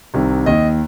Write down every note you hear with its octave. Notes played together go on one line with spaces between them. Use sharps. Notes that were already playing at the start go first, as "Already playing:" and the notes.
C2 C3 D#3
D#2 D#3 D#5